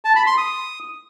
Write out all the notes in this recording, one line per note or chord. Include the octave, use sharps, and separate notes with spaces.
A5
B5
C6
D#6